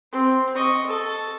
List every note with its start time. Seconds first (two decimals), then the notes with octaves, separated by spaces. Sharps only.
0.12 C4
0.56 D#5 C#6
0.87 A4